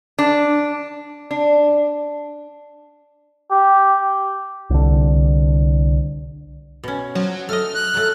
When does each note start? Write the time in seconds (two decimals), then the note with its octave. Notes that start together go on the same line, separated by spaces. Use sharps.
0.19 D4
1.31 D4
3.51 G4
4.70 C2 D3
6.84 B2 C#4
7.15 F3 F#3
7.49 A3 D#5 F6
7.75 F#6
7.94 F#3 A3